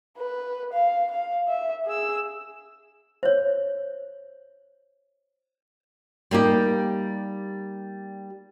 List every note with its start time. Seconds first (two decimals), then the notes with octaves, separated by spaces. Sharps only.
0.18 B4
0.73 F5
1.11 F5
1.48 E5
1.86 G#4 E6
3.23 C5 C#5
6.31 G3 A#3 D#4 G4